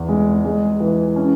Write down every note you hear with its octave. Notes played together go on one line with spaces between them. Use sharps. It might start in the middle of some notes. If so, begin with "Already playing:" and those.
Already playing: E2
G#3
G#3
E3
C#4